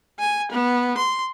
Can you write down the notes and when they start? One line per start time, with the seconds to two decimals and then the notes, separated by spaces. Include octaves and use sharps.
0.19 G#5
0.52 B3
0.97 C6